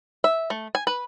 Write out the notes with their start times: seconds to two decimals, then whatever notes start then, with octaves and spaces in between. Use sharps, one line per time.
0.24 E5
0.50 A3
0.75 G#5
0.87 B4